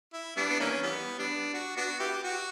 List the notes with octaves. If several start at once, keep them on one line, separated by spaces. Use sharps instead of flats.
E4
G3 B3 D4
B3
E3 A#3 C#4
E3 G3 B3
G3 B3 D4
F#4
B3 D4 F#4
B3 E4 G4
F#4